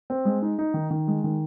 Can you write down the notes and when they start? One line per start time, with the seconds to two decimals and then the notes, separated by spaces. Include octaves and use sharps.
0.10 C4
0.25 G#3
0.42 D#4
0.59 D#4
0.74 D#3
0.90 D#3
1.08 G#3
1.24 D#3